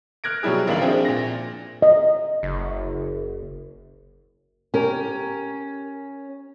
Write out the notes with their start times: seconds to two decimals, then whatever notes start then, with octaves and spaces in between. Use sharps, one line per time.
0.24 F6 F#6 G#6 A#6 D7
0.43 B2 F#3 G3 E4 G#4
0.67 A#1 D#2 A#3 E4 F5 F#7
0.82 F3 C4 D4 G#4 E5
1.05 A#2 A#6
1.82 D#5
2.43 F#1
4.74 C#4 G4 A#4